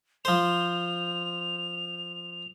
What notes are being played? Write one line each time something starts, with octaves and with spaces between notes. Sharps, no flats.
F3 C5 F7